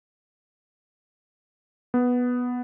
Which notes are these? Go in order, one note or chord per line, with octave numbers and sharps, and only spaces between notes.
B3